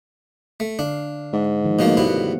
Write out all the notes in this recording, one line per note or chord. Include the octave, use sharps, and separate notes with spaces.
A3
D3 D4 F5
G#2
D#3 F3
B2 F3 A3 A#3 C#5 F5
G2 B2 G#3 B3 E4 F#5